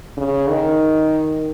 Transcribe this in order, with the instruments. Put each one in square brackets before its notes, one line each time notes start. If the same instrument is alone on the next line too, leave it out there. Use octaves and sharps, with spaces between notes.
[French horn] C#3
D#3